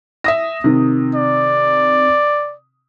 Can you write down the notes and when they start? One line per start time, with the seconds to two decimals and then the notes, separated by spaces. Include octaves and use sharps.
0.24 E5 D#6 A#6
0.64 C3 D#3
1.15 D5